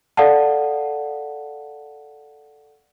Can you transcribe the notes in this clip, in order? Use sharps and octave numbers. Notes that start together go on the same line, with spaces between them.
A4 D5 F5 F#5 A5